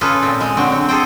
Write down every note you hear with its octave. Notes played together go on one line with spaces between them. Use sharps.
C#3 F4 G#4 A4 B4
A#2 C4
G#3
D3 F#3 C4
C4
G#4 A4 C5 G5